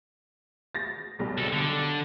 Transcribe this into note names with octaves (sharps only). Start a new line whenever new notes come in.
A6 A#6
B1 G3
C2 A4
D3